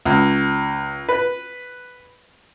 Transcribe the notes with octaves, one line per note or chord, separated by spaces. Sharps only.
C#2
B4